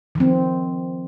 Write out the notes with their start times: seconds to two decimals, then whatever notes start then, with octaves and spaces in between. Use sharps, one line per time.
0.15 D#3
0.18 F3
0.20 C4